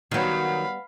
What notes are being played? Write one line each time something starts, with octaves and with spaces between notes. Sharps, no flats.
D#3 F#3 G3 B3 F5 B5